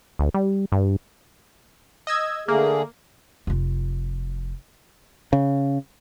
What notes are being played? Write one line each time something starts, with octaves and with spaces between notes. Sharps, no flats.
D2
G3
G2
D#5 E6 G#6
D3 A3 A#3 G#4
F1 F4
C#3